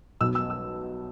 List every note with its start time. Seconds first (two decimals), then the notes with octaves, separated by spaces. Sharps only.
0.20 B1 B2 B3 E6
0.35 E6
0.50 E6